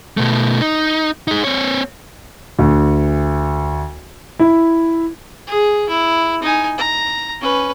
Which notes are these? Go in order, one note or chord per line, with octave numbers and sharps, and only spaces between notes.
B2 A3
D#4
D#4 G#4
C4 C#5
D2
E4
G#4
E4
D#4 G#5
A#5
C#4 B4